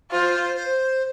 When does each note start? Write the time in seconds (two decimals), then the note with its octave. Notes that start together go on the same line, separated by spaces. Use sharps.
0.11 F4 C5
0.56 C5